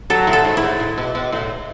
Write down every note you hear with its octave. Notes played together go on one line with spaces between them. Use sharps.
F#3 A4
A2
A4
G#2
E4
A2
A2
B2
B2
A2